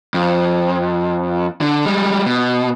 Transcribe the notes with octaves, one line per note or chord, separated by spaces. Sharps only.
F2
D3
G3 G#3
B2